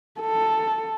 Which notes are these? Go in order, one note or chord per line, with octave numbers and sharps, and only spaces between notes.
A4